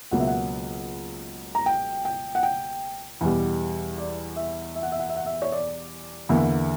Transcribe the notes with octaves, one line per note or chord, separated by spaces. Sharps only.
C#2 B2 F#3 A#3 F#5
E5
F#5
A#5
G5
G5
F#5
G5
E2 B2 G3
D5
E5
E5
F#5
E5
F#5
E5
F#5
E5
C#5
D5
E2 D3 A#3 E4